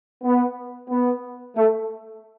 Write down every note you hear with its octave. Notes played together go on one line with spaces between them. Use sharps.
B3
B3
A3